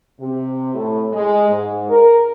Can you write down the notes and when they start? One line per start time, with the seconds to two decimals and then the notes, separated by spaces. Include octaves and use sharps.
0.20 C3
0.75 A2
1.13 G#3
1.49 G#2
1.90 A#4